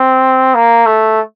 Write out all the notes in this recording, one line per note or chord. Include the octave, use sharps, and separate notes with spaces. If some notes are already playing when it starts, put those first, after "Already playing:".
Already playing: C4
A#3
A3